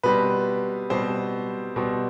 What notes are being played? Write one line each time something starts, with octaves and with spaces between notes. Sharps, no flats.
B2 G3 C4 B4
B2 G3 C4 C5
B2 G3 C4